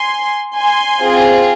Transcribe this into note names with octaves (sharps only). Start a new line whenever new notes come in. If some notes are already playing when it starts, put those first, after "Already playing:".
Already playing: G#5 C6
G#5 C6
C4 F4 G#4